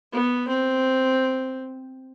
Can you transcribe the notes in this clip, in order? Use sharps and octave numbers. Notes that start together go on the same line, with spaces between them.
B3
C4